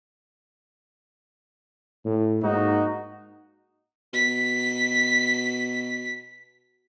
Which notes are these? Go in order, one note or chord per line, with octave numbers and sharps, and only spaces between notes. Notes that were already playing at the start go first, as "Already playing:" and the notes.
A2
G#2 A#3 D#4 F#4
B2 B6